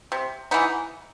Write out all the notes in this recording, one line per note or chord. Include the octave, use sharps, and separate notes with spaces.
C3
E3 B3 D#4